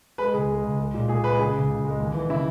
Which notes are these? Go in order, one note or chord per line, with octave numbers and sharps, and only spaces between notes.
G#3 B4
C#2 G#4
G#3
C#2
G#3
A#2
A#2 G#4
G#3 B4
C#3 G#4
C#2
C#2
G#3
D#2
E3
C#3 E4